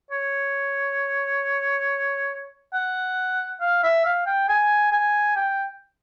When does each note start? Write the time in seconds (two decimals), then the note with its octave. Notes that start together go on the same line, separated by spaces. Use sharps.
0.11 C#5
2.73 F#5
3.60 F5
3.83 E5
4.05 F5
4.26 G5
4.48 G#5
4.91 G#5
5.36 G5